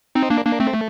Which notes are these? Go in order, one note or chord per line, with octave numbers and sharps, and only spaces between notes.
C4 D#4
A#3 D4
A#3 D4
A3 C4
A3